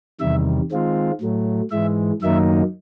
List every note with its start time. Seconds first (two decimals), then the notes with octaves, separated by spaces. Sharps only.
0.20 E2 C3 D#3 G3 E5
0.71 D#3 G#3 C4 F4
1.21 A2 F#3 A3
1.71 G#2 E3 G#3 E5
2.22 F#2 D#3 F#3 A#3 D#4 E5